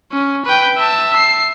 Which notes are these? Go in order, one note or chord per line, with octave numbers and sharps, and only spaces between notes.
C#4
B4 G5
E5 A5
C7